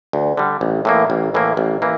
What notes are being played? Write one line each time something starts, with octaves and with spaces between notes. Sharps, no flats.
D2
D3 G3
A1
A2 E3 A#3
A1
A2 E3 A#3
A1
E3 A#3